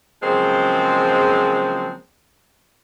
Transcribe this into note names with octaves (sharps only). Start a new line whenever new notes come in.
C#3 F3 F#3 G#3 A#3 C4